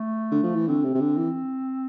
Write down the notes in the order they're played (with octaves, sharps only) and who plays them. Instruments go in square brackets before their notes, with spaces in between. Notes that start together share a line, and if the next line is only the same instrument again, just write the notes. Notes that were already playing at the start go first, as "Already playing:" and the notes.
Already playing: [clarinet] A3
[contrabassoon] D3
F3
E3
[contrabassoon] D3 [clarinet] C4
[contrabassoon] C3
C3
D3
E3